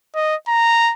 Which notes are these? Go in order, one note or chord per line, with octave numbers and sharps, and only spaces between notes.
D#5
A#5